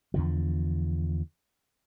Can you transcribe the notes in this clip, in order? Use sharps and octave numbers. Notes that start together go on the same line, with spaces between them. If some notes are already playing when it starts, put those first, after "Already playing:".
E2 D3 F3